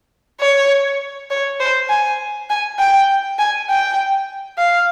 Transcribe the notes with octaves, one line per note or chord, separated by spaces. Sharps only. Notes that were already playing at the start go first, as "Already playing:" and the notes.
C#5
C#5
C5
G#5
G#5
G5
G#5
G5
F5